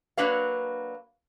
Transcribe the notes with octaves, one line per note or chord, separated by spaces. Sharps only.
F#3 A#3 D4 B4 F5